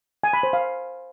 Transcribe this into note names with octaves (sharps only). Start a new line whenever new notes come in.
G#5
B5
C5
F5